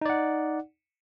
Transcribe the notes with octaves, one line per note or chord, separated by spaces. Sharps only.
D#4 D5 F#5